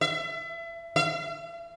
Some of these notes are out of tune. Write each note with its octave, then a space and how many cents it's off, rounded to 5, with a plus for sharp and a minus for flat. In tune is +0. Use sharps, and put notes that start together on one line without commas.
E5 +30
E5 +45